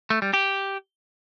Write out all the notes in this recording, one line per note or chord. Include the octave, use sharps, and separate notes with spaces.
A3
G3
G4